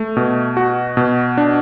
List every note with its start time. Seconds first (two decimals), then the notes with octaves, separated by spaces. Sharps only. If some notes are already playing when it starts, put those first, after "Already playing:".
Already playing: A3
0.17 B2
0.57 F#4
0.97 B2
1.37 D4